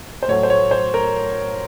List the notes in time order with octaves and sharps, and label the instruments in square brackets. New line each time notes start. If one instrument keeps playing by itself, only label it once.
[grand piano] C5
A2 F#3 A3 C#5
C5
C#5
C5
A#4